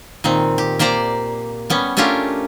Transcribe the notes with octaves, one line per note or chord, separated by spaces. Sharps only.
A#2 D#3 C4
G4
A#3 G4 C5 D5 A#5
G3 B3 C#4
A3 C#4 D4 F4 G4 A#4